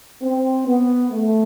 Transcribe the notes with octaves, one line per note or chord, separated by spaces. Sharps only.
C4
B3
A3